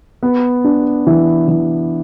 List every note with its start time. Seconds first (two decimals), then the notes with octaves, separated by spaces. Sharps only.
0.23 B3
0.64 D4
1.07 E3
1.48 E3